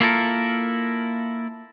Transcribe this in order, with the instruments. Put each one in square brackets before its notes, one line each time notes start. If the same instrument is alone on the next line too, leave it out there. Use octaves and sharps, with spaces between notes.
[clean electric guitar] A#3 E4 F4 A4 A#4